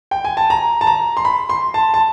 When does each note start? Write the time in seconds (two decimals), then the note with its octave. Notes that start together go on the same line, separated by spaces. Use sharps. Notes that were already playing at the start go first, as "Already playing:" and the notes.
0.11 G5
0.25 G#5
0.37 A5
0.50 A#5
0.81 A5
0.87 A#5
1.17 C6
1.25 B5
1.49 C6
1.74 A5
1.94 A5